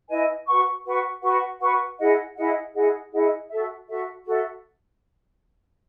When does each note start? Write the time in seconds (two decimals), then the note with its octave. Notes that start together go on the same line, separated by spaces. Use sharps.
0.09 E4 B4 D#5 G#5
0.47 F#4 B4 F#5 C#6
0.84 F#4 B4 F#5 C#6
1.23 F#4 B4 F#5 C#6
1.60 F#4 B4 F#5 C#6
1.99 E4 G#4 D#5 F#5
2.36 E4 G#4 D#5 F#5
2.75 E4 G#4 D#5 F#5
3.12 E4 G#4 D#5 F#5
3.50 F#4 A4 E5
3.88 F#4 A4 E5
4.26 F#4 A4 E5